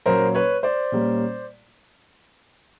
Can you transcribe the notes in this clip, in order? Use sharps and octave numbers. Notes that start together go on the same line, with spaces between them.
A#2 F#3 A#3 C#4 A#4 C5
B4 C#5
C5 D5
A#2 G3 A#3 C#4